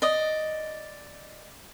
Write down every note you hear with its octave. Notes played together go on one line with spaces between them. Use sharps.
D5 D#5